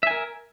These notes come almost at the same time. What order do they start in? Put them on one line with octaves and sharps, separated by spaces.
E5 G#5 A#4